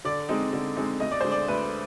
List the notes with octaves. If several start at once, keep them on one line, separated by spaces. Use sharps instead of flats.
D3 D5
G#3 C4 D#4
D3
G#3 C4 D#4
D2 D#5
D5
D3 G#3 D4 C5
D5
D2 B4